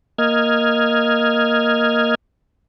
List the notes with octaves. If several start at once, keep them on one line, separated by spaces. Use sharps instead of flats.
A#3 D#5 F6 G#6